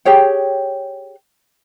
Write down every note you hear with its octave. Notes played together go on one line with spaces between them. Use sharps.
G4 G#4 C#5 G5